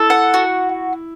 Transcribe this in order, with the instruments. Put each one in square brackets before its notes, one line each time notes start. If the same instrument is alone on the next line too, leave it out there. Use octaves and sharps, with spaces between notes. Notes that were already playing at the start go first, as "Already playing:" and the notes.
Already playing: [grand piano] E4 [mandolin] A4
[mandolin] F#5
F#4